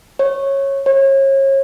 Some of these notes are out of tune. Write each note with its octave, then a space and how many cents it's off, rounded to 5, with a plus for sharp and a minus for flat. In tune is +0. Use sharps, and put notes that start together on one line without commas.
C#5 -15
C#5 -35